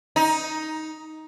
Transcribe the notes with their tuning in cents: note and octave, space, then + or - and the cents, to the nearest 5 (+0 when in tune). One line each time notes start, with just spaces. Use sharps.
D#4 +10